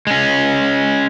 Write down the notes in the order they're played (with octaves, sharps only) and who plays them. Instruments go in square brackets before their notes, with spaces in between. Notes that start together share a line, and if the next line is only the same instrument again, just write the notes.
[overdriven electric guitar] G#3 C#4